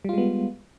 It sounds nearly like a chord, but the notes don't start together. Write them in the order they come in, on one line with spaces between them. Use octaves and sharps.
G3 F4 G#3 B3